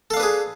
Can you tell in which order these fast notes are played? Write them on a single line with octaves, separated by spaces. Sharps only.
A4 F5 D4 B4 G#4